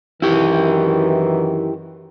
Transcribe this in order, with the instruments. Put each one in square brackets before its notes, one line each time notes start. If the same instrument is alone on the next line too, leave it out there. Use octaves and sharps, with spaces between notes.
[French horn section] F#2 D#3 E3 [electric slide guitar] E4 G4